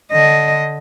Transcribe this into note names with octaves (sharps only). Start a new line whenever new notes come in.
D3 D#5